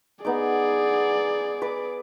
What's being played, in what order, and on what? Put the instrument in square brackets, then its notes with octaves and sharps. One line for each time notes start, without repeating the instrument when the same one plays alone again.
[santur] B3 D#4 D6 [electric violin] G#4 D5
[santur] B4 D6